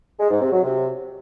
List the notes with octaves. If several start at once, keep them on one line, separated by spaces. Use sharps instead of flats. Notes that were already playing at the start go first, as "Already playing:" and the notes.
G#3
G#2
C3
F#3
C3